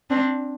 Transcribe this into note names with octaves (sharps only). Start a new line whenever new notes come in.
C4 D4